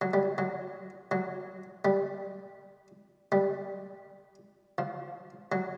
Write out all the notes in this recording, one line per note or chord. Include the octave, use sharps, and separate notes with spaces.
F#3
G3
F#3
F#3
G3
G3
F3
F#3